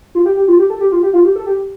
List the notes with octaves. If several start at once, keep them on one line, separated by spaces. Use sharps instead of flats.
F4
G4
G4
F4
G4
A4
G4
F4
G4
F4
G4
A4
G4